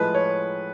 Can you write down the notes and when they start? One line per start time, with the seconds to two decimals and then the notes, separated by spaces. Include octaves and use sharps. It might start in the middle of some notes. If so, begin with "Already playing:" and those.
Already playing: A2 F3 G#3 B4
0.15 C#5